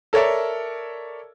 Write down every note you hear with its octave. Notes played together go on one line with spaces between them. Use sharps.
A4 A#4 C#5 D5 E5